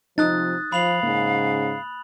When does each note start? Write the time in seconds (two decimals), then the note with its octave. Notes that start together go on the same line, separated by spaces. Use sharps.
0.18 C3 F3 D#4 D#6 F#6 A6
0.72 F3 F5 B5 F7 F#7
1.03 G#2 C#3 A#3